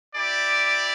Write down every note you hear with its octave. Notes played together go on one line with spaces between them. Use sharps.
E4 G4 D5